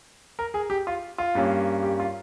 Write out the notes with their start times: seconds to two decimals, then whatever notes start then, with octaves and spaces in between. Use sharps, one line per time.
0.39 A#4
0.54 G#4
0.70 G4
0.87 F4
1.18 F4
1.35 G2 G3 A#3 C#4
1.83 G4
2.00 F4